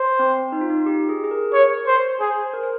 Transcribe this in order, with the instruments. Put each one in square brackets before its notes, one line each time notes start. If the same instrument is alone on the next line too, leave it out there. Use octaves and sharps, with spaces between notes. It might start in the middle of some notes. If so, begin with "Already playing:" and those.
Already playing: [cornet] C5
[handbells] C4
D#4
F4
D#4
G4
G#4
G#4
A#4
[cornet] C#5
C5
[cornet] G#4 [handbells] C5
[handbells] A#4
C5